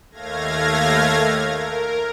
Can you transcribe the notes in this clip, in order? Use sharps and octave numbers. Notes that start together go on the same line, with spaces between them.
D#2 A3 F5 G#6 A#6
A#4